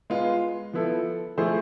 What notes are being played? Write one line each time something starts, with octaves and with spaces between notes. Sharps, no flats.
G#3 B3 F4
F3 B3 E4 A4
F3 A3 E4 G#4 C5